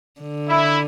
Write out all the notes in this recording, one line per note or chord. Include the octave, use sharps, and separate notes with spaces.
D3
E4